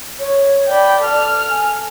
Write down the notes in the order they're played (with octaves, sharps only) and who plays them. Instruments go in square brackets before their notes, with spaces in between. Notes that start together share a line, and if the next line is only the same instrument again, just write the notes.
[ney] C#5
[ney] D5 [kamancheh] G5 B5
[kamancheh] A4 F6
[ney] G#5